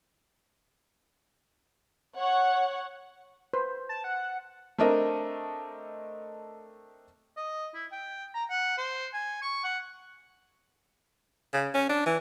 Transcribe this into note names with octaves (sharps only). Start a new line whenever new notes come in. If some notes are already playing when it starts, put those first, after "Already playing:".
C#5 F#5
B4 C5
A5
F#5
A3 C4 D4 A#4 D#5
D#5
E4
G5
A#5
F#5
C5
G#5
C#6
F#5
C#3
C#4
D4
E3